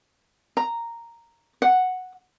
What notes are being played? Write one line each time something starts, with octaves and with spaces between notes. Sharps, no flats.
A#5
F#5